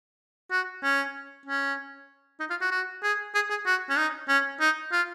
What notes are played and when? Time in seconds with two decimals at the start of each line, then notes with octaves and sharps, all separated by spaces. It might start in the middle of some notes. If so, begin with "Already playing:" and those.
0.51 F#4
0.83 C#4
1.46 C#4
2.40 D#4
2.50 F4
2.61 F#4
2.72 F#4
3.03 G#4
3.35 G#4
3.50 G#4
3.66 F#4
3.90 C#4
3.98 D#4
4.28 C#4
4.60 D#4
4.92 F4